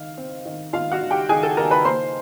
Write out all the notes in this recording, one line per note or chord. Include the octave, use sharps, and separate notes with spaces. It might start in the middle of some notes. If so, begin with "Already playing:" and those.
Already playing: D#3 F5
C4
D#3
D#3 F4 F5
F#4 F#5
D#3
G4 G5
D#3 G#4 G#5
A4 A5
D#3 A#4 A#5
B4 B5
A#3 C5 C6